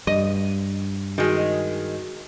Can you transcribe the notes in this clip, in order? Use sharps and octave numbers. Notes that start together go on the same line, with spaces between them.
G2 D#5
D#3 G#3 F#4